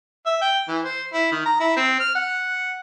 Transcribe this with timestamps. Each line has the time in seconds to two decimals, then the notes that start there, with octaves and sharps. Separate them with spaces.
0.26 E5
0.41 G5
0.68 E3
0.84 C5
1.13 E4
1.32 D#3
1.46 A#5
1.60 E4
1.77 C4
2.00 F6
2.15 F#5